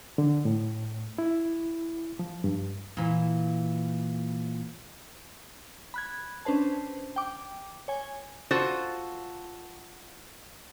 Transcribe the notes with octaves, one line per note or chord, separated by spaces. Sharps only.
D3
A2
E4
F3
G2
A#2 E3
B5 F#6 G#6
C#4 D4 B4 C5 A5
G5 D6
C#5 G#5
F4 F#4 A4 C5